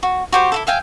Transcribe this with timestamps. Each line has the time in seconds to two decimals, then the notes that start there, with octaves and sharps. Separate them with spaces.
0.03 F#4
0.32 F#4 G4 C5
0.52 E4 F#4 A4
0.67 E5 F5 G5 G#5